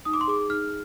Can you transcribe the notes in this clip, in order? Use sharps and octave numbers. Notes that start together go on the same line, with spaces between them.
D#4 D#6
D6
C6
G#4 D6
D#4 F6